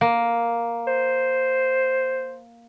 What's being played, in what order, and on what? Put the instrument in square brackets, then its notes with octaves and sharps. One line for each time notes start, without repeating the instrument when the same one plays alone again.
[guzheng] A#3
[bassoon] C5